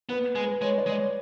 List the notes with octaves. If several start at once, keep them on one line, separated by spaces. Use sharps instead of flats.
B3 B4
G#3
B4
G#3 C#5
D5
G#3
C#5